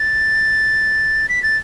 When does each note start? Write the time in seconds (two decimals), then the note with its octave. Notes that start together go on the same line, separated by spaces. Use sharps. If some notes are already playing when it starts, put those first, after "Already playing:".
Already playing: A6
1.29 B6
1.43 A6